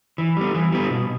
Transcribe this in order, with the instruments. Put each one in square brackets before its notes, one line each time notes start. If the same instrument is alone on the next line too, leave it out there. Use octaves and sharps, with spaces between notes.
[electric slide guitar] E3
G3 B3
E3
G3 B3
B2